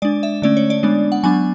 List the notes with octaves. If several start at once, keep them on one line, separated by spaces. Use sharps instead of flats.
G#3 D4 D5
E5
D3 A3 C#4 D5
C#5
D5
G#3 B3 D4
F#5
F#3 B3 D4 G#5